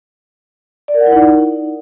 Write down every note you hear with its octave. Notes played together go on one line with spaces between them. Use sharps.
D5
A#4
F#5
E4
D#4